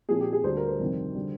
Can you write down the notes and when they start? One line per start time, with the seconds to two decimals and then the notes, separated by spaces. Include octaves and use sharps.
0.09 A#2 F3 C4 G#4
0.21 G4
0.33 G#4
0.44 D2 D3 G3 D4 C5
0.57 A#4
0.68 C5
0.79 F2 C3 D#3 G3
1.15 D3 G3